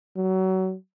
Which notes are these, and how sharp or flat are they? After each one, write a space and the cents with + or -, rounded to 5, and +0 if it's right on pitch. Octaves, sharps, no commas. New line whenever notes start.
F#3 +25